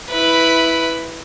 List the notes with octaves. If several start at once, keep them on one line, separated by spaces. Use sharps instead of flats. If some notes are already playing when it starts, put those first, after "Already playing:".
E4 B4